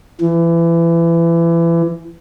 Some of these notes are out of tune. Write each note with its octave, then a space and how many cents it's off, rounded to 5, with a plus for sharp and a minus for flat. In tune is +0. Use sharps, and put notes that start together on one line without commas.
E3 +25